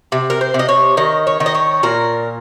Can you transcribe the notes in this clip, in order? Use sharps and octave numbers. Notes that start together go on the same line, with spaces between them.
C3
A#4
C5
C3
D#5
C#5
D#3 D#5
C#5
D#3
D#5
C#5
A#2 A#4